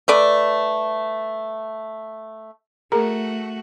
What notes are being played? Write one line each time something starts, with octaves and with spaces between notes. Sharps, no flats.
A3 B4 D5
A3 F#4 G#4 A#4 A#5